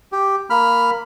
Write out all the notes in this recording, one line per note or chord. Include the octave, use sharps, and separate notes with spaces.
G4
A#3 B5 F6